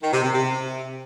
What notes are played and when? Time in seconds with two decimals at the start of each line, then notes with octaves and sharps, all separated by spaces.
0.03 D#3
0.13 C3
0.23 C3
0.34 C3